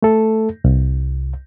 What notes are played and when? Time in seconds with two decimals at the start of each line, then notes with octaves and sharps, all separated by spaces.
0.02 A3 A4
0.64 C2